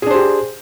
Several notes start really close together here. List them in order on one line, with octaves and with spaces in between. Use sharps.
G#4 D4 C5 G4